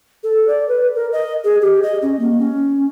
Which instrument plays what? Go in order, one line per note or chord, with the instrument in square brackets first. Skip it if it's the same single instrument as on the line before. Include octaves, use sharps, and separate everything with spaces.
[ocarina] A4
D5
B4
A#4
D#5
G#4
G4
D#5
C#4
A#3
C#4